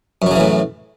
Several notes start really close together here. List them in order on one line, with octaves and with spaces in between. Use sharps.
F#2 F#3 C#3 E3 A2